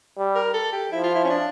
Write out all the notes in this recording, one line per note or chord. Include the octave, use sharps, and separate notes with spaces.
G3
A#4
A4
G4
F3 E4
F4
E4
C#4
D4